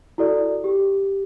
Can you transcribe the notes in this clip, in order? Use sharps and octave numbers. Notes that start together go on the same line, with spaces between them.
E4 F#4 A4 D5
G4